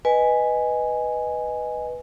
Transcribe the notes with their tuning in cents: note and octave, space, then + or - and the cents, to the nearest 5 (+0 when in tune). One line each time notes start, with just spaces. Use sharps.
B4 +0 D#5 +0 G#5 +0